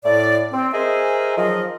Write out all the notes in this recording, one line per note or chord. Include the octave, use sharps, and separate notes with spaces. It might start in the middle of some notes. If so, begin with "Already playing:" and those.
A2 D5
C4
G#4 A#4 C5 D#5 E5 G#5
D#3 F3 F#3 G#4 A#4 D#5